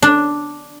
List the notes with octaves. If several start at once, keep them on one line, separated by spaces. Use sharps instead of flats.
D4